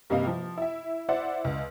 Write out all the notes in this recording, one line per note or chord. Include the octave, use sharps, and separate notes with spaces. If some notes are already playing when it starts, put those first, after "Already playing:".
G2 C3 A#3 D#5 F5
F3
E4 E5
E4 C5 D5 E5 F#5
C#2